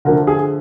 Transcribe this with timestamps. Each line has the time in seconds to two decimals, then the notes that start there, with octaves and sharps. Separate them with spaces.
0.05 D3 F3 A3 A#4
0.27 G#4